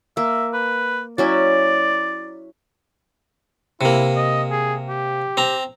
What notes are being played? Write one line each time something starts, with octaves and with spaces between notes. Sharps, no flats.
A#3 E5
B4
F#3 C#4 E4 D5
C3 A#3 E4
D#5
G#4
G4
C4 A#5